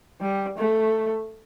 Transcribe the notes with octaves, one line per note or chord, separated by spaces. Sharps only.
G3
A3